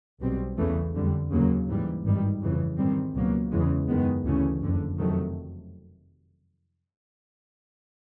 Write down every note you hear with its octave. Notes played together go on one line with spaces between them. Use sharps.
B1 B2 G3 C4
E2 C#3 E3 A3
F2 D3 G3
D#2 C#3 F#3 A#3
G#2 E3 G3
G#1 G2 D#3 G3
F2 C#3 E3
G#2 D#3 G3 C4
C#2 B2 F#3 A#3
E2 C#3 E3 G#3
F#2 D#3 G#3 B3
D2 C#3 E3 A3 C#4
F#1 F2 D3
F2 C3 D#3 F#3 A3